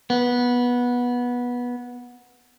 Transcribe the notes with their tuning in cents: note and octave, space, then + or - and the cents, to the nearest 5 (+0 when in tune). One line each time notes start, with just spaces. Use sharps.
B3 -15